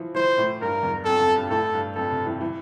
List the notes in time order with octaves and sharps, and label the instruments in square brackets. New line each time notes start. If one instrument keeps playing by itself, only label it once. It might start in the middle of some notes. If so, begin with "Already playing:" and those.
Already playing: [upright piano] E3 F3
[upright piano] E3 [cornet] C5
[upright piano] A2
[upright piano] G2 [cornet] A#4
[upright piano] E2
[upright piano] F2 [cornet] A4
[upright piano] F2
G2
[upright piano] A2 [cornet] A4
[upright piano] G2
[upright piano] F2 [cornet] A4
[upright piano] C3
E3
E3